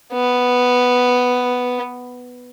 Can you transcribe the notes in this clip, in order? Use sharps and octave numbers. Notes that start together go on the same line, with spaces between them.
B3